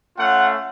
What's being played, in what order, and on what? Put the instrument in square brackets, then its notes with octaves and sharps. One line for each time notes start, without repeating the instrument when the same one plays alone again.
[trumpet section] A3 C#4 F4 F#5